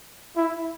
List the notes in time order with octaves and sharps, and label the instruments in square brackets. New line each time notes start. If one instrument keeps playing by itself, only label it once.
[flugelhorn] E4